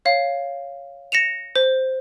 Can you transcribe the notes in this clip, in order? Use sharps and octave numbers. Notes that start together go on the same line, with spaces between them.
C#5 F5
A#6 C#7 E7 F7
C5